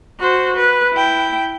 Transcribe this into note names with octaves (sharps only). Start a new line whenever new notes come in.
F#4 C5
B4
E4 G5